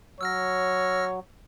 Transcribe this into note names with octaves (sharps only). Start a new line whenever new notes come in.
F#3 C#5 E6 F6 A#6